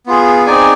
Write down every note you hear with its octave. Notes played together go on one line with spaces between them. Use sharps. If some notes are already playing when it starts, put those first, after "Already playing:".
B3 F4 G#4
C4 D#4 G#4 D5 G#5